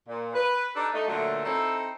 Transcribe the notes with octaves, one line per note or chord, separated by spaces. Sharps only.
A#2
B4
D4 D#4 G4 A4 B4 D5
A3 D#4
A#2 D3 F#3 A3
C4 D#4 E4 A4